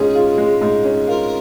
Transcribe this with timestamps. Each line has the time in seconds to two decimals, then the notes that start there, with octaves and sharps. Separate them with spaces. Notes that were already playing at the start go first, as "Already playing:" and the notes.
Already playing: G#2 G#3 C#4 F4 G#4
0.15 F4
0.38 G#3
0.61 G#2
0.84 C#4
1.07 F4 A#4